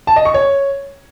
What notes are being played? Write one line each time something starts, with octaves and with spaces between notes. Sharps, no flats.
A5
D#5
C#6
C#5